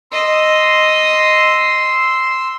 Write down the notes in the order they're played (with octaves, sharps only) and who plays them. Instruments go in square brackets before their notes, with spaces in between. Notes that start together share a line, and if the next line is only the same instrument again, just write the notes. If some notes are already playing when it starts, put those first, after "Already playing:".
[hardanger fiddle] D#5 [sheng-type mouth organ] C6 E6